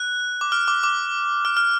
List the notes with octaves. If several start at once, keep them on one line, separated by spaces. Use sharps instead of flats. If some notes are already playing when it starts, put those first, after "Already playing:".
Already playing: F#6
D6
F6
D6
D6
F6
F6